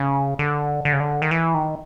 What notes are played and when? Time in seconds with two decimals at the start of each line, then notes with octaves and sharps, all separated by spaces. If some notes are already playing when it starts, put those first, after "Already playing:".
Already playing: C#3
0.39 D3
0.85 D3
0.93 C#3
1.00 D3
1.22 D#3
1.31 E3
1.54 D#3